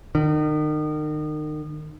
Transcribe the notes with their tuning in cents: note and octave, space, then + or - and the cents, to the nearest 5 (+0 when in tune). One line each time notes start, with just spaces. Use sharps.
D#3 -35